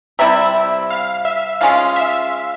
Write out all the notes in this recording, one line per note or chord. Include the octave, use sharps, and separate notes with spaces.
C3 G3 C4 E4 E5
F5
E5
G#3 C#4 F4 F5
E5